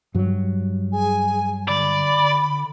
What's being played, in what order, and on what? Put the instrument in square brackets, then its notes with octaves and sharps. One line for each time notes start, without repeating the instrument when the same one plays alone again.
[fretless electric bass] G2 F#3
[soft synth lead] G#4 [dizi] G#5
[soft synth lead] D3 [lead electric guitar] D5 [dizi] B5